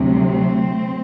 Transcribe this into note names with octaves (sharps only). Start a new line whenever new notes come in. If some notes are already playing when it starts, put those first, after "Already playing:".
Already playing: D2 C3 F#3
A3 C4